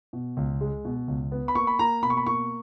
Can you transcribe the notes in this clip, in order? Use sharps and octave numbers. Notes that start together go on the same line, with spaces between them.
B2
C#2
G#3
B2
C#2
B3
B5
A#3 C#6
B5
A#3 A#5
B2 B5
C#6
B5
A#3 C#6